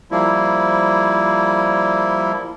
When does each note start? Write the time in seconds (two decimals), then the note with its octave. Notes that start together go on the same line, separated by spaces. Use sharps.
0.11 F3 G3 A#3 E4